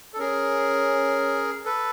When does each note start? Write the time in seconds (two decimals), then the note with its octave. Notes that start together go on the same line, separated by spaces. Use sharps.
0.14 A4
0.19 C#4 G#4 A#4
1.65 A4 B4